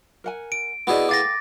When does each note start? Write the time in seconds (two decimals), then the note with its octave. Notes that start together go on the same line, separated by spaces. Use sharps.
0.24 A#4 F#5 G#5
0.52 D7
0.87 B3 E4 F#4 G#4 D5 D#5
1.09 A4 F5 G5 D6 A6 A#6